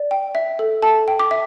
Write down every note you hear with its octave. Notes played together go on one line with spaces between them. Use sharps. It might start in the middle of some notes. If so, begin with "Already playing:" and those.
Already playing: D5
G5
E5
A4
A4 A5
G5
D6
E5